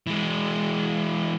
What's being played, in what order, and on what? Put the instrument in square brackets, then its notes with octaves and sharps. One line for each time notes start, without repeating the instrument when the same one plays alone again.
[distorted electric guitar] E3 G#3